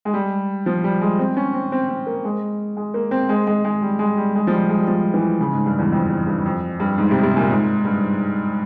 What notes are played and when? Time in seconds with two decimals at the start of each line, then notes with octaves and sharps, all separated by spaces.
0.05 G#3
0.14 G3
0.66 F3
0.84 G3
1.01 G#3
1.19 C4
1.37 C#4
1.54 C4
1.72 C4
1.89 C4
2.07 A#3
2.24 G#3
2.77 G#3
2.94 A#3
3.11 C4
3.29 G#3
3.47 G#3
3.64 G#3
3.82 G3
3.99 G#3
4.17 G3
4.35 G#3
4.47 F3
4.51 G3
4.69 G#3
4.80 G3
4.87 F3
5.14 E3
5.40 C#3
5.53 G#2
5.66 G2
5.79 E2
5.92 F2
6.10 F2
6.27 G2
6.45 F2
6.80 G2
6.98 G#2
7.11 C3
7.23 C3
7.37 A#2
7.51 G#2
7.85 G2